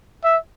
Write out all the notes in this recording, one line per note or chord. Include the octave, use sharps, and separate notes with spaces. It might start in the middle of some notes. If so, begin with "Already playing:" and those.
E5